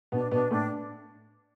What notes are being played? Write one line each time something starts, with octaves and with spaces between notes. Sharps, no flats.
B2 B3 D4
B2 B3 D4
A2 A3 D4